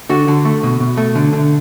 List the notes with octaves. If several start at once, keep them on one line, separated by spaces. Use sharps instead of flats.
D3 F#4
D3
A3
B2
B2
A3
D3
D3